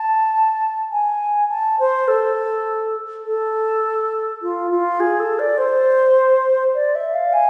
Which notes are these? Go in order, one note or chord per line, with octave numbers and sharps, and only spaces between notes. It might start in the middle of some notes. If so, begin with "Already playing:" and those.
Already playing: A5
G#5
A5
C5
A4
A4
F4
F4
G#4
A4
D5
C5
D5
E5
F5
G#5